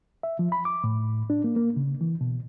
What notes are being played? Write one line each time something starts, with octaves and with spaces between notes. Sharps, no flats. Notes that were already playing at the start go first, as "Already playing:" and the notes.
E5
F3
B5
D6
A2
D4
A#3
A#3
C#3
E3
B2